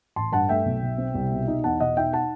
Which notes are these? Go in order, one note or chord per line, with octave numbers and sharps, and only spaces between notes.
A1 A5 C6
G2 F#5 A5
A3 E5 G5
B1
B2
C4
C2
B2
D#4
E2 F#5 A5
B2 D#5 F#5
D#4 E5 G5
F#5 A5